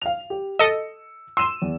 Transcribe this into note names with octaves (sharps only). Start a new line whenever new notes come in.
F5 F7
G4
A4 D#5 E6 C#7
C6 E6 D#7 E7
E2